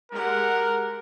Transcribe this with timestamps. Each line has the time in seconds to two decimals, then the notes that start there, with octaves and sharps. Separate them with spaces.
0.12 G#3 G4 A#4 F#5